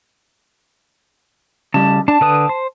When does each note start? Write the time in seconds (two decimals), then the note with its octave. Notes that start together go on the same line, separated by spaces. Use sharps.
1.74 C#3 G3 A5
2.08 D4 A5
2.21 D3 B4 D#6
2.49 C5